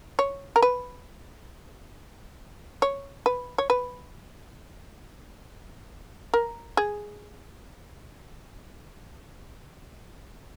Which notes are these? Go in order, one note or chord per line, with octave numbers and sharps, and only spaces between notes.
C#5
A#4
B4
C#5
B4
C#5
B4
A#4
G#4